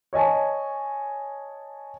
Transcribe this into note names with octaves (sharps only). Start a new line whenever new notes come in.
C#5 D#5 G#5 A5